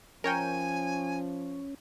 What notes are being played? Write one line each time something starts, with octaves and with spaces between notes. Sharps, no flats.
F3 C#4 A#4 C#5 G5 G#5